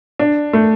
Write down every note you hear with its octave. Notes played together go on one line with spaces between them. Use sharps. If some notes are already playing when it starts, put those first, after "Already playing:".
D4
A3